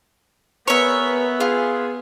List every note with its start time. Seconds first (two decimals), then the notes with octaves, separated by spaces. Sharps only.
0.68 B3 G#4 A#4 B4 C#5 E5
1.40 F4 G#4